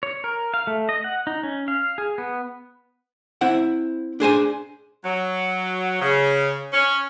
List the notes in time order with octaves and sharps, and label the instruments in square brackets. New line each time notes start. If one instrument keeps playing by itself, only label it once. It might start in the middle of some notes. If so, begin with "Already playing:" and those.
[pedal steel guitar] C#5
A#4
F5
A3
D#5
F#5
D#4
C#4
F5
G#4
B3
[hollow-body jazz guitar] C4 E4 F#5
D4 G#4 C5 G#5
[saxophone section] F#3
C#3
C#4